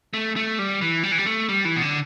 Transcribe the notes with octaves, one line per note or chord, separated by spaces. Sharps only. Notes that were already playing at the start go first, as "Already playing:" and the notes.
A3
A3
G3
E3
G3
E3
G3
A3
G3
E3
B2
D3